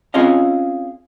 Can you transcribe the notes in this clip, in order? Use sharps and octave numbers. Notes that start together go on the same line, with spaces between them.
C4 C#4 F4 G#4 D#5 F5